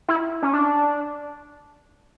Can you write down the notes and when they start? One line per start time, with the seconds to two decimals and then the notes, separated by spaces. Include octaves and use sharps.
0.08 E4
0.42 C#4
0.53 D4